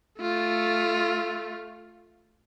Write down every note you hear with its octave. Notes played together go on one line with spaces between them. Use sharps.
A3 F4